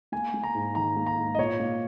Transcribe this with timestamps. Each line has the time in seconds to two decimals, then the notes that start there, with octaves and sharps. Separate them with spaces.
0.12 A#3 G#5
0.34 A#3
0.43 A#5
0.55 G#2
0.75 D#3 A#5
0.96 A#3
1.07 A#5
1.18 G#2
1.35 D#5
1.38 A#2 C#5
1.60 A#3